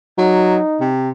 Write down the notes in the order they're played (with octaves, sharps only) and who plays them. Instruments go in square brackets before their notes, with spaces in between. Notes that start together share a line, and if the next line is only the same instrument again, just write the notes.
[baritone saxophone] F#3 [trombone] D#4
[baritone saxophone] C3